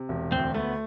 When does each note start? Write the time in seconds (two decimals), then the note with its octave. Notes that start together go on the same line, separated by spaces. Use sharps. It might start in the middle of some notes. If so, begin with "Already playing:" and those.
Already playing: C3
0.09 E1
0.31 D2 C4
0.54 A3 B3